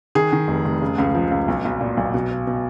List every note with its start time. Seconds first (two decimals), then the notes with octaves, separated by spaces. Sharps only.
0.15 D#3 G#4
0.33 D#3
0.48 F1
0.65 F1
0.82 C#3
0.98 C#2
1.15 F3
1.31 C#2
1.48 B1
1.65 B1
1.81 A#2
1.97 B1
2.14 B2
2.31 B2
2.47 B2